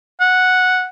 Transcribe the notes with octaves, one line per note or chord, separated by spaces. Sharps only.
F#5